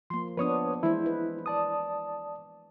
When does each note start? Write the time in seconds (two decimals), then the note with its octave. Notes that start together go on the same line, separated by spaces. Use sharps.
0.10 F3 A#3 C6
0.37 F3 B3 D4 B4 C#5 D#6
0.83 E3 G#3 E4 C5
1.06 B4
1.46 D5 A5 D#6